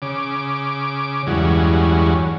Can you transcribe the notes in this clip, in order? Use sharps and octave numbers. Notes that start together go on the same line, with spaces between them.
C#3 D6
E2 G2 F#3 G#3 C#4